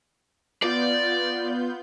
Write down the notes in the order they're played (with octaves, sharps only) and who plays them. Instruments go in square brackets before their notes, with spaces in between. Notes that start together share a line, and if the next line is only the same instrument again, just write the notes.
[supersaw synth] B3 F4 G6 [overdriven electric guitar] D5